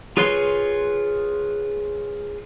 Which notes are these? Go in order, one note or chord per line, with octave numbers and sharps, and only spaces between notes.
F4 G#4 B4 C#5 C6